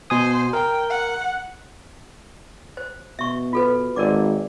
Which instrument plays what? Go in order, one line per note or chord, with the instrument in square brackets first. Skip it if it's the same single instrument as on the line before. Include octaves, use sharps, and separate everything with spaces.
[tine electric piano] B2 G#5 D#6 [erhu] C5
[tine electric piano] A#4 [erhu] G5
[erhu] F#5
[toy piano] C5
[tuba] B2 [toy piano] E5 C#6
[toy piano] F4 A4 B4
[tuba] G#1 [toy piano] A#4 D5 D6